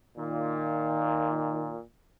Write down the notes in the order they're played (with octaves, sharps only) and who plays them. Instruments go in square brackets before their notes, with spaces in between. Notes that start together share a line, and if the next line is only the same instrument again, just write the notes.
[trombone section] A#2 [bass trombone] D#3